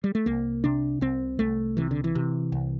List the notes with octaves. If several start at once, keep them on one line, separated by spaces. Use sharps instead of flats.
G3
A3
C2 A#3
C3 D4
C2 C4
C2 A3
C3 E3
D3
E3
C3
C2